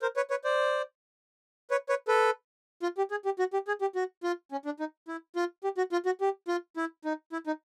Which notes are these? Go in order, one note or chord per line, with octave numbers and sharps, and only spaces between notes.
A#4 C5
B4 C#5
B4 C#5
C5 D5
B4 C#5
B4 C#5
A4 B4
F4
G4
G#4
G4
F#4
G4
G#4
G4
F#4
F4
C#4
D4
D#4
E4
F4
G4
F#4
F4
F#4
G4
F4
E4
D#4
E4
D#4